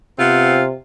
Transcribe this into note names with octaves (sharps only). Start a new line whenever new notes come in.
C3 B3 C4 F4